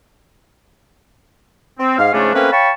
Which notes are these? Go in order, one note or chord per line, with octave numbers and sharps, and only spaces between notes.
C4
G#2 F5
G#2 C#3 F3 A3 C#4 D4
A3 A#3 C4 C#4 B4
C#5 F5 G5 A5 B5 C#6